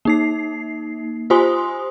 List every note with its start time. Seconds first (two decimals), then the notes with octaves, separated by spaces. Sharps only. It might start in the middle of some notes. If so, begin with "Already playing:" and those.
0.05 A#3 D#4 C7
1.30 F4 G4 C5 G#5 C6 D#6